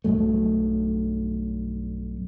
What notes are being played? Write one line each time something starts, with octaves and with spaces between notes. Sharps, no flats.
B1 G2 F#3 A3